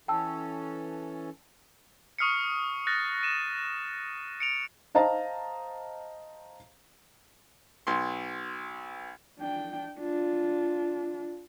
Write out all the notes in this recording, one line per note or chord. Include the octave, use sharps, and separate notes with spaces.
E3 C#4 A4 G5 A5 E6
C#6 D#6 F6 C7 C#7
F6 F#6 A6 A#6
D#7 E7
C#7 D7 F7
C5 D#5 F5 A5 A#5
B1 C6
D4 G5
D4 F4